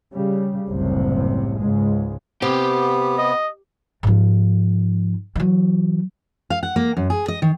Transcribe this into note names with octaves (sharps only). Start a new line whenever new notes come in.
C#3 G3
F#1 C2 A2 C3
C#2 G#2 G#3
C3 B3 G4 G5
D#5
G#2 F3
E3 F#3
F5
F#5
A#3
F#2
G#4
D#5
D#3